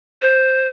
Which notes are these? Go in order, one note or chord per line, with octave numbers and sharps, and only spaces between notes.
C5